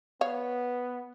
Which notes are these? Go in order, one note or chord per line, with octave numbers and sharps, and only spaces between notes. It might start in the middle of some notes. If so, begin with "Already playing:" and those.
B3 C#5 F5